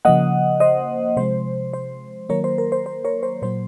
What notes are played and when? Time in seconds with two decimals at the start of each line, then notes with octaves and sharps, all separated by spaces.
0.05 C#3 F3 A#3 D#5 F#5
0.60 C5 D#5
1.17 C3 F3 G#3 C5
1.73 C5
2.29 D#3 F#3 A#3 A#4 C#5
2.44 C5
2.58 A#4
2.72 C5
2.86 C5
3.05 A#4 C#5
3.23 C5
3.42 A#2 F#3 A#3 C5